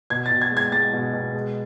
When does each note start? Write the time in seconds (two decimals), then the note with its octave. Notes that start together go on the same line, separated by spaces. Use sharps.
0.10 B2 G#6
0.26 A6
0.31 B2
0.42 G#6
0.51 G#3
0.57 G#6
0.72 G#3 A6
0.93 B2
1.13 B2
1.34 G#3